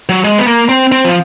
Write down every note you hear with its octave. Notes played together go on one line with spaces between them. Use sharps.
F#3
G#3
B3
A#3
C4
C4
F3